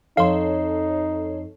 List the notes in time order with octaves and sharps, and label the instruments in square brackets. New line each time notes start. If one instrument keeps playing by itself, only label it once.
[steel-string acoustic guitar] F2 [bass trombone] D#4 [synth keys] A4 C#5 C7 [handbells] F5 C6